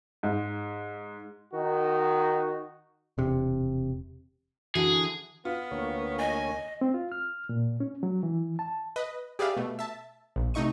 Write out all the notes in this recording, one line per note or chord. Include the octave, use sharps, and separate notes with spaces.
G#2
D#3 D#4 F#4
E1 C3
D3 E3 F#4 G#4
B3 F4
D2 A#3 C#5
D#5 G#5
C4
F4
F6
A#2
C#4
F#3
E3
A5
B4 D#5
G4 G#4 B4 D5 E5 F5
B2 A3
E5 A5
A#1
C3 A3 D#4 D#5 C#6 D#7